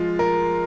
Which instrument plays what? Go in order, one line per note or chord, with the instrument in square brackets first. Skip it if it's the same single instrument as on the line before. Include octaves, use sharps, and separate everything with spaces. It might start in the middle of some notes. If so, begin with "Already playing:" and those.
Already playing: [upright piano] F3 G#3 F4
A#4